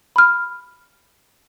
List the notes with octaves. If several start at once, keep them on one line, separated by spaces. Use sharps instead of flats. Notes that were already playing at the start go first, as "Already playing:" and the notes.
B5 F6